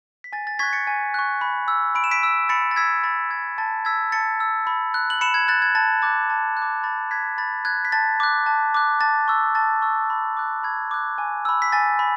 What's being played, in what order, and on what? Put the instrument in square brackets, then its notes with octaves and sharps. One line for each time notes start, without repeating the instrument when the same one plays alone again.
[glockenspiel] B6
G#5 A6
A6
C#6 F#6 G#6 B6
A6 C#7
G#5
C#6 F#6
B5
E6
B5 D7
E7
B6 D7
E6
B5 A6 C#7
A6
E6 G#6 B6
B5 A6
E6 G#6
A5 A6
E6 G#6 B6
A5 A6 C#7
E6
B5
F#6
F#7
B5 C#7 E7
G#6
F#6 A6
G#6
A5 A6
D6 F#6 A6
A5
F#6
D6
B5 A6
F#6 G#6 B6
B5 A6
F#6 G#6
B6
A5 A6
D6 F#6
A5
D6 F#6
A5 A6
C#6 E6
A5 A6
C#6 E6
B5
D6 F#6
B5 G#6
D6 F#6
G#5
B5 E6
B6
G#5 A6
B5